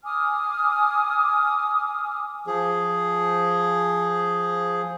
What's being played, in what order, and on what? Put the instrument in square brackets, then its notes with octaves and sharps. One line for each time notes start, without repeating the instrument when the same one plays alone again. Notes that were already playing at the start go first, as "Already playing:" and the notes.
[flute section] G#5 D6 D#6 F6
[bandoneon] F3 G#4